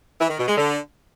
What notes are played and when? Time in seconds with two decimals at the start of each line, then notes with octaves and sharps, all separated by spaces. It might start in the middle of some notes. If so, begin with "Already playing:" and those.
0.20 E3
0.29 D#3
0.39 B2
0.48 G#3
0.58 D3